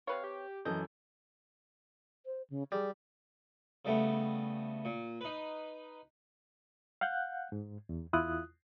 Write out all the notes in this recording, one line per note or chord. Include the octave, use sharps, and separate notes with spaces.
C3 B4 C#5 F5
G4
F#2 E3 A4 D#5 G6
C5
C#3
G3 G#4
C#3 G3 A3 B3
A#2
D#4 B4
F5 F#5 F#6 G6
G#2
E2
E2 E4 F4 D#6 F#6